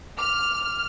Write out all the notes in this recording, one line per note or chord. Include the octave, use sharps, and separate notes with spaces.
D6 F6